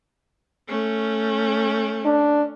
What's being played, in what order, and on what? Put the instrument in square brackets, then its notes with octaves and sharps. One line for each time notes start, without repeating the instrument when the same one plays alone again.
[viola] A3 C#4
[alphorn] D4